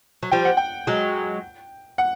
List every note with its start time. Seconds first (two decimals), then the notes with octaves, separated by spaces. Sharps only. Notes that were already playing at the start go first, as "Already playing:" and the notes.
0.23 F#3
0.31 F3 G3 G5
0.45 F#5
0.57 G5
0.87 F#3 G#3
1.98 F#5